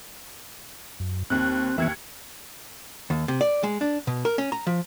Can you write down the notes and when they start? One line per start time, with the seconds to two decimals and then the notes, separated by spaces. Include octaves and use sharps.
1.00 F#2
1.30 D#2 C4 F#6
1.78 D#2 E3 B3 E5 G#6 C#7
3.10 D#2
3.28 C3
3.41 D5
3.63 G#3
3.81 D4
4.07 B2
4.25 A#4
4.38 C#4
4.52 A#5
4.67 F3